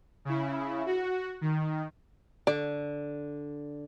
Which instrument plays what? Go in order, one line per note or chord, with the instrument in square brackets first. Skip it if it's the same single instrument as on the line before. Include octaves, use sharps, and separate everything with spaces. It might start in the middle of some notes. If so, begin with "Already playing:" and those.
[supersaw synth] C#3 E4
F#4
D#3
[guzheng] D3 [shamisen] D5